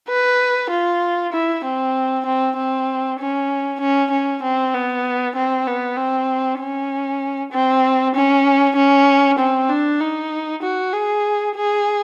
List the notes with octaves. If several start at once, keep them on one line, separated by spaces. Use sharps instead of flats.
B4
F4
E4
C4
C4
C4
C#4
C#4
C#4
C4
B3
C4
B3
C4
C#4
C4
C#4
C#4
C4
D4
D#4
F#4
G#4
G#4